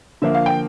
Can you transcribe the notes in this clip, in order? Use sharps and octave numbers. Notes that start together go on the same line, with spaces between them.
D3 F3 A#3 E5
F5
G5